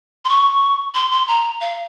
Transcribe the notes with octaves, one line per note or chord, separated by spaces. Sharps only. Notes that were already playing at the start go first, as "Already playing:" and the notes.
C6
C#6
C6
C6
A#5
F5